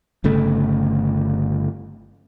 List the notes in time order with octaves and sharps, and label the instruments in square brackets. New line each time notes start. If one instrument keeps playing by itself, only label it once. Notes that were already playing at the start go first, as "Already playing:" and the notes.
[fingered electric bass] G1 C#3 A3